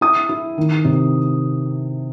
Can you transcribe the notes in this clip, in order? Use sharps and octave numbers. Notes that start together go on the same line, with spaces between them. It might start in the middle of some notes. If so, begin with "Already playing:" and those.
E4 D#6
E4
D#3
C3